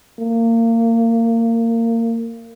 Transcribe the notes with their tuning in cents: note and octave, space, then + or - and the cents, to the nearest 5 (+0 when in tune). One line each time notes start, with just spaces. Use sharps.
A#3 -25